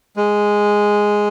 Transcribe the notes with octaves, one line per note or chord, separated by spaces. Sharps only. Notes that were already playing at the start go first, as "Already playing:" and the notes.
G#3